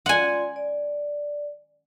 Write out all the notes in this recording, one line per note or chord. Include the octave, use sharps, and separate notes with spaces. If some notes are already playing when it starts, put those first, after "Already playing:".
F4 D5 F#5 G#5 C6
D5